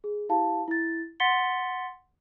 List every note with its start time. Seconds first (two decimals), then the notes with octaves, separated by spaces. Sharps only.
0.04 G#4
0.29 E4 G4 F5 A5
0.68 E4 A6
1.20 F#5 C6 A6 B6 C#7 G7